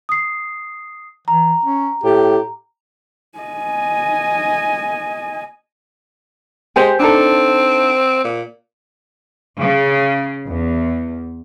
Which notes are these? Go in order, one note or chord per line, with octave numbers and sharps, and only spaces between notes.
D#6 C7
E3 A#5
C#4
A2 G4
D#5 G#5
G#3 G4 C5 G#5
C4 D4 D#4 A4
A#2
C#3
E2